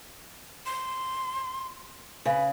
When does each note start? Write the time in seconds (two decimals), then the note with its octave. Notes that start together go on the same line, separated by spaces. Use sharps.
0.66 C6
2.25 C#3 B4